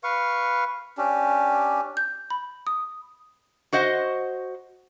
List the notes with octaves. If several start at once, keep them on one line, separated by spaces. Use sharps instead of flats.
B4 F5 C#6
C#4 D4 G4
G6
B5
D#6
F#4 C5 D#5 F#5